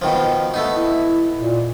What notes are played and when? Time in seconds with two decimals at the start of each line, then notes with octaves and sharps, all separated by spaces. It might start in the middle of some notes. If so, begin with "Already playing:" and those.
0.02 B2 D#3 F3
0.54 A3 B3 D#4
0.73 E4
1.38 A#2